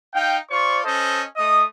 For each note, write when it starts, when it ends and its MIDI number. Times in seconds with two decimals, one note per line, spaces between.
0.14 0.36 63
0.14 0.36 77
0.14 0.36 79
0.50 0.80 65
0.50 0.80 72
0.50 0.80 74
0.50 0.80 85
0.84 1.22 61
0.84 1.22 69
0.84 1.22 72
0.84 1.22 75
1.37 1.64 57
1.37 1.64 75
1.37 1.64 87